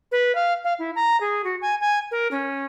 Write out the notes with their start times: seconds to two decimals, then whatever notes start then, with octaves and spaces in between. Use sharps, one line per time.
0.12 B4
0.35 F5
0.64 F5
0.79 E4
0.96 A#5
1.21 G#4
1.44 F#4
1.62 G#5
1.81 G#5
2.11 A#4
2.31 C#4